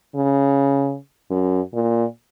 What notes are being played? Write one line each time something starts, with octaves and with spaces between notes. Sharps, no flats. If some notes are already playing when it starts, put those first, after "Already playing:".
C#3
F#2
A#2